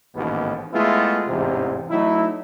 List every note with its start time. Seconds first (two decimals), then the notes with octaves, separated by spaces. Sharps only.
0.15 A1 D#2 G#2 B2 B3
0.73 G#3 A3 B3 E4 F4
1.27 A1 E2 G#2 C3
1.89 F#3 A3 D#4 E4